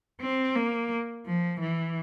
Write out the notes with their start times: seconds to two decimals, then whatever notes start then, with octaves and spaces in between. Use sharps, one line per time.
0.21 C4
0.56 A#3
1.26 F3
1.60 E3